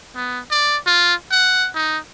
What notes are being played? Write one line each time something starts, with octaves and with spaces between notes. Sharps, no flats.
B3
D5
F4
F#5
D#4